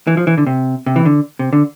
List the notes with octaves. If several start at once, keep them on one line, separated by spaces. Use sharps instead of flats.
E3
F3
E3
D3
C3
C3
E3
D3
C3
D3